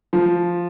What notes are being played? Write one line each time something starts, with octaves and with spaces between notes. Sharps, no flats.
F3